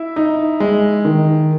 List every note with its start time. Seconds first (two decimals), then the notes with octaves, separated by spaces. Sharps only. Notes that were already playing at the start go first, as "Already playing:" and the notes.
Already playing: E4 E5
0.16 D#4
0.60 G#3
1.05 D#3